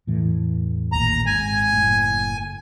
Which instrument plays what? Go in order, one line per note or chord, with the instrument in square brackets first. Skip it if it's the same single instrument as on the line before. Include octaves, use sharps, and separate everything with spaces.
[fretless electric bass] E2 A2 E3
[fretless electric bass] A1 D#2 A#2 [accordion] A#5
[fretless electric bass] G#1 G#2 [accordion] G#5
[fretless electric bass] F#1 A2